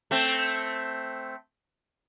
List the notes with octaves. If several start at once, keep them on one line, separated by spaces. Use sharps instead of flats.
A3 C4